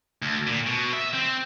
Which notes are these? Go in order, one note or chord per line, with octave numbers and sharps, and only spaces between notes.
D2
A#2
B2
E5
C4